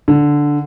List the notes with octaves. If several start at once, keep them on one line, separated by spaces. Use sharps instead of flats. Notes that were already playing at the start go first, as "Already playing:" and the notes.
D3